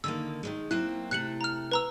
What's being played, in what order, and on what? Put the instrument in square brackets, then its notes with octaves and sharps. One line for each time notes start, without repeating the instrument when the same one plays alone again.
[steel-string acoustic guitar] D3 D#3 A#3 [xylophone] E6
[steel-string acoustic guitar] D#3 F3 G#3
[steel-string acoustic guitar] F#3 A#3 C4 [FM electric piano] E4 [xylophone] F#6
[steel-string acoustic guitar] C3 A3 [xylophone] F#6 C#7 F#7
[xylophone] A#5 F6
B4 A#5 E6